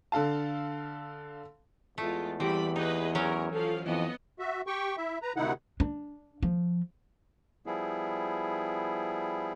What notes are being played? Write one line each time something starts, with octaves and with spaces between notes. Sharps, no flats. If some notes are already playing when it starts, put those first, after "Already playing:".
D3 A4 F5 A5
E2 G#3 A3 F4
E3 G3 C4 G4 B5
D#4 G#4 B4 D#5
F#3 C#4 A#4
F3 A4 F5
F2 E3 B3 D#5
F#4 E5
G4 G5 C#6
E4 E5
B4 A#5
D2 C3 D#3 D#4 E4 F#5
D4
F3
F3 G3 B3 E4 G#4